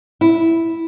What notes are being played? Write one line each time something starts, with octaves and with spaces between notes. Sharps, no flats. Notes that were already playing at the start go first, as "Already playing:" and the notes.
E4